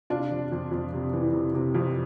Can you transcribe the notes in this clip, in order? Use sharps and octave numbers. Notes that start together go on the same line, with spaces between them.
C3 D4 F4
F2
F2
F2
C3
E3
C3
C3
F2